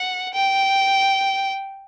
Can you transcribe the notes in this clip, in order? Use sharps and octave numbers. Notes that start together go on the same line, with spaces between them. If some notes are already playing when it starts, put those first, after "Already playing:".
Already playing: F#5
G5